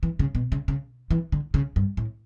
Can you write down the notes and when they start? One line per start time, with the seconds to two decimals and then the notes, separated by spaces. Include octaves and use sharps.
0.03 E3
0.19 C#3
0.35 B2
0.52 C#3
0.68 C#3
1.10 E3
1.32 D3
1.54 C#3
1.76 G2
1.97 A2